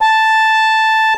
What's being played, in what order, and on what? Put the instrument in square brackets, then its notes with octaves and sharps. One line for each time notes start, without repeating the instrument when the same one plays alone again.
[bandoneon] A5